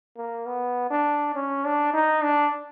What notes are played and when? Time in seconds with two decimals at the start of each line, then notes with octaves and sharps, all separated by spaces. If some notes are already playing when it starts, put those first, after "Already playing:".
0.17 A#3
0.47 B3
0.90 D4
1.35 C#4
1.65 D4
1.94 D#4
2.23 D4